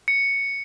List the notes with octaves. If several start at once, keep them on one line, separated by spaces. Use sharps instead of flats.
C#7